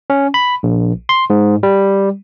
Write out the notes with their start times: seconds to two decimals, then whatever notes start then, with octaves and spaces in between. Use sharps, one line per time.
0.10 C#4
0.34 B5
0.63 A#1
1.09 C6
1.30 G#2
1.63 G3